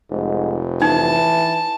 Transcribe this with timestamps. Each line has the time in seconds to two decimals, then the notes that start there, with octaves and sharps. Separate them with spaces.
0.11 F1 G#2
0.82 E3 D#4 A5